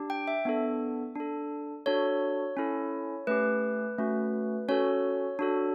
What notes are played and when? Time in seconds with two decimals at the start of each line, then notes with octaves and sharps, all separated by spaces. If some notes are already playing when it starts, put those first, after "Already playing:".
Already playing: D4 G4
0.10 G5
0.28 E5
0.45 B3 D4 A4
1.15 D4 A4
1.86 D4 F#4 A4 C#5
2.57 C#4 E4 A4
3.27 A3 C#4 G4 B4
3.98 A3 C#4 F#4
4.69 C#4 F#4 A4 C#5
5.39 D4 F#4 A4